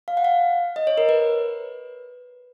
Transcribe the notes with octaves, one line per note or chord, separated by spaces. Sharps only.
F5
F#5
F5
D#5
C#5
A#4
B4